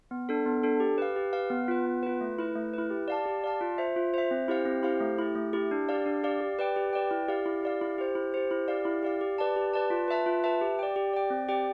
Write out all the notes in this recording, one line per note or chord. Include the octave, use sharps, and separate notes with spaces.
B3
D4 A4
B3
D4 A4
G4
B4 F5
G4
B4 F5
B3
F4 B4
B3
F4 B4
A3
E4 B4
A3
E4 B4
G4
D5 F5 A5
G4
D5 F5 A5
F4
C5 E5
F4
C5 E5
C4
E4 G4 C5 F5
C4
E4 G4 C5 F5
A3
E4 G4
A3
E4 G4
D4
G4 D5 F5
D4
G4 D5 F5
G4
B4 D5 G5
G4
B4 D5 G5
E4
G4 D5 F5
E4
G4 D5 F5
E4
G4 C5
E4
G4 C5
E4
G4 D5 F5
E4
G4 D5 F5
G4
B4 D5 A5
G4
B4 D5 A5
F4
B4 E5 A5
F4
B4 E5 A5
G4
D5 G5
G4
D5 G5
C4
G4 D5 G5